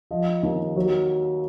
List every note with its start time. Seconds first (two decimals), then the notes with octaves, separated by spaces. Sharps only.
0.11 F3 D#5
0.43 D#2
0.76 F#3